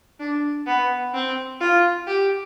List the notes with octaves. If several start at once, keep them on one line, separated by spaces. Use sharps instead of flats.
D4
B3
C4
F4
G4